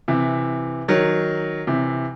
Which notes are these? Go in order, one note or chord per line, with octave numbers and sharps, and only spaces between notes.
C3 E3
D#3 F#3
C3 E3